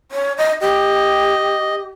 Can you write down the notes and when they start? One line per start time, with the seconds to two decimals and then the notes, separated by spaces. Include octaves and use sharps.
0.12 C#5
0.38 D#5
0.61 G4 D#5